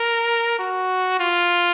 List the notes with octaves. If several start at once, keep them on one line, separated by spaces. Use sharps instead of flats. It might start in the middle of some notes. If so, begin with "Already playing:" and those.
Already playing: A#4
F#4
F4